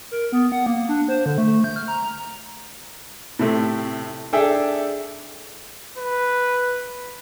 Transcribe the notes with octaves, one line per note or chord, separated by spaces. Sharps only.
A#4
B3
F#5
A#3
D4
C5
D3
A3
G6
F6
A#5
A2 C3 A3
D4 G#4 A4 E5 G5
B4